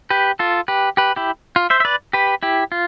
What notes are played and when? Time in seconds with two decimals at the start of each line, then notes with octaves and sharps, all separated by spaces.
0.10 G4 B4
0.39 F4 A4
0.68 G4 B4
0.97 G4 B4
1.16 E4 G4
1.56 F4
1.70 C5 E5
1.80 E5
1.85 B4 D5
2.13 G4 B4
2.43 E4 G4
2.72 F4